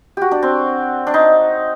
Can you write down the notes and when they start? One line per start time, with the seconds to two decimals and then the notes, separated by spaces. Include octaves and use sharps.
0.17 F#4 G4
0.31 D4
0.43 C4
1.07 D4
1.14 D#4